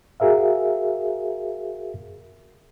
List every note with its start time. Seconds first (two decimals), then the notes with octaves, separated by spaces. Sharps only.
0.20 F#4 G#4 A#4 E5 F5